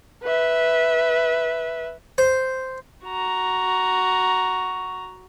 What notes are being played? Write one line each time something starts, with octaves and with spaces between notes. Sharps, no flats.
B4 E5
C5
F#4 A#5